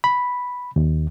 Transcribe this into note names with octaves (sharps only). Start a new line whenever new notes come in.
B5
D#2